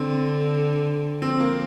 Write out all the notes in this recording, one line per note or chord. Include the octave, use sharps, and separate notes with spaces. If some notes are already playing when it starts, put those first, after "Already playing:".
Already playing: D3 C4
F3 C4
A#3